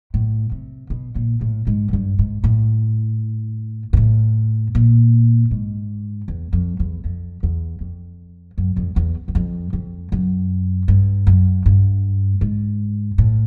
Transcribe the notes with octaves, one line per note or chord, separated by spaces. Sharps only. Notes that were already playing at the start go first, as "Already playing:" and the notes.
A2
C3
B2
A#2
A2
G#2
F#2
G2
G#2
A2
G#2
A2
A#2
G#2
E2
F2
E2
F2
E2
F2
F#2
F2
E2
E2
F2
F2
F#2
G2
F#2
G2
G#2
A2